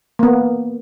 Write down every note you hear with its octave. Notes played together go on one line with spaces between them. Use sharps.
A#3 B3